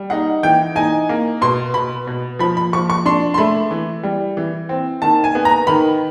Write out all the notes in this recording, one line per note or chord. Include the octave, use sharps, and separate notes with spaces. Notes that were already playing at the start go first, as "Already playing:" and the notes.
Already playing: G3
D#4 F#5
E3 G5
D#4 G#5
A#3
B2 C6
B2 B5
B2
F3 B5
B5
F3 C#6
C#6
D4 C6
C6
A3 B5
E3
G3
E3
C4
D#3 A5
G#5
B3
A#5
D#3 B5